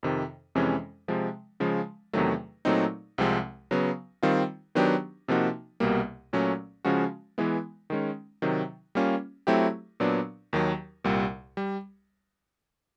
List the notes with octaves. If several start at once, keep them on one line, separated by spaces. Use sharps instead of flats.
F2 C3 D#3
F2 C3 E3 G#3 C#4
C3 F3 G#3
C#3 F3 G#3
E2 C3 D#3 F#3 A3
A#2 F#3 A3 C4 D#4
C2 C3 F3 G#3 C4
C#3 F#3 B3
D#3 G3 C4 F4
D#3 F#3 B3 D4 G4
C3 F3 A#3 D#4 F#4
C2 B2 G3 A#3
A#2 F#3 A3 C#4
C#3 F3 G#3 C#4 F#4
E3 G#3 B3 E4
D#3 G#3 C#4
C3 D#3 F#3
G3 A#3 C#4 F4
F#3 A3 C4 E4 G4
A#2 F#3 B3 D4
D#2 D#3 F#3
C2 A#2 G3
G3